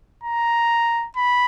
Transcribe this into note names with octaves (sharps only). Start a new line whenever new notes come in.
A#5
B5